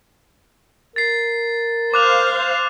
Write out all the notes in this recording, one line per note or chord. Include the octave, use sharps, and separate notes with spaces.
A#4 A6 C7
C5 F5 D6 F#6 F7